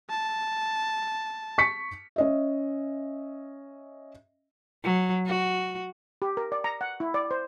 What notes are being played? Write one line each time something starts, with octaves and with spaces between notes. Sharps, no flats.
A5
C#6 B6 C#7
C#4 D#5 E5
F#3
F#4
G4
A#4
D5
A#5
F#5
E4
D5
C5